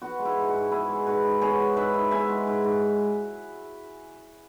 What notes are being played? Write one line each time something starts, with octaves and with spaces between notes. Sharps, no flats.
B3 F#4
G#3
E4
G#2
F#4
G#2
B3 E4 G#4
G#3
G#2 F#4 B4
G#2
B3 G#4 C#5
G#3
G#2 B4 E5
G#2
B3 E5 G#5
G#3
G#2
G#2